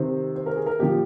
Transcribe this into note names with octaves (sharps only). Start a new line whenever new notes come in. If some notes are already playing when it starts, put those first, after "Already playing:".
Already playing: C3 D#3 C5
C5
A#4
G#4
A#4
A#2 F3 G4